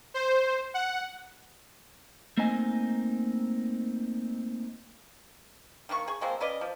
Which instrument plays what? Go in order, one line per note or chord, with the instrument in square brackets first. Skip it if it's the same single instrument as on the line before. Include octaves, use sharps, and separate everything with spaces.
[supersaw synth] C5
F#5
[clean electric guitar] A3 A#3 C4 D#4 D#5 G#5
[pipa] D#3 A#3 E4 C#6
G#4 C#6
F3 G#3 A#3 C4
C#4 B4 D5 D#5
F3